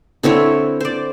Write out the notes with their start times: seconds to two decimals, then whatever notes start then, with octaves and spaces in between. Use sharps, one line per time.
0.23 D3 C4 E4 C#5
0.81 C5 D5